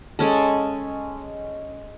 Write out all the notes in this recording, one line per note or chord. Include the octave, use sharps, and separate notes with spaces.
G#3 C#4 A4